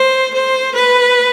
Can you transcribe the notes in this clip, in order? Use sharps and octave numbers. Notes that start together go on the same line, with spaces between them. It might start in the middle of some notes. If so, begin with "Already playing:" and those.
Already playing: C5
C5
B4